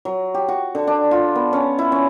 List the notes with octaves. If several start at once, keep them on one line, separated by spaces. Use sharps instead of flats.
F#3
G4
F#4
D3
D4
F4
B3
C#4
E4
C#4